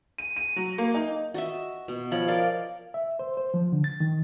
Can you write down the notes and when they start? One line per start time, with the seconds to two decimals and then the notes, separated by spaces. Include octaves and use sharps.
0.18 D#7
0.37 D#7
0.56 F#3
0.78 A#3
0.94 D#4
1.34 F#4 D#5 E5
1.88 B2
2.11 F3 C#5 B5
2.28 A#4 D5 D#5 F5
2.94 E5
3.19 C5
3.37 C5
3.54 F3
3.72 D3
3.84 A6
4.00 D#3